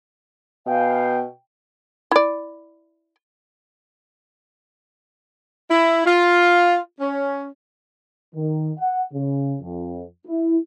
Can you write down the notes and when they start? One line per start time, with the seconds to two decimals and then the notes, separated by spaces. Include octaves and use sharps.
0.67 B2 B3 F5 G5 G#5
2.11 E4 D5
5.70 E4
6.06 F4
7.00 C#4
8.35 D#3
8.79 F#5
9.13 C#3
9.62 F2
10.27 E4